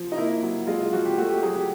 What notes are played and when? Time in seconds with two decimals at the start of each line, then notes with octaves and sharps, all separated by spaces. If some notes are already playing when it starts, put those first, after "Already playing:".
Already playing: F3
0.12 D#4
0.17 A#3 E4
0.42 F#3
0.67 G#3 F4
0.81 F4
0.93 F3 F#4
1.05 G4
1.18 A3 F#4
1.30 G4
1.43 F#3 G#4
1.55 G4